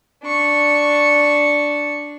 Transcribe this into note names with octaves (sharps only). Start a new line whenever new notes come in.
D4 C#6